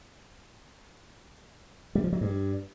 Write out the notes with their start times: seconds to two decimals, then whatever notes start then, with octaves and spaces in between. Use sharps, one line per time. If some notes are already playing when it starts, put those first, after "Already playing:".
1.95 G3
2.04 F3
2.13 F#3
2.21 G2